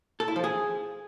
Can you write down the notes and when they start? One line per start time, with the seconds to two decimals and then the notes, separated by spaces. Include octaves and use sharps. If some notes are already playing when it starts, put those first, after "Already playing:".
0.20 A4
0.28 E4
0.36 F3
0.44 G#4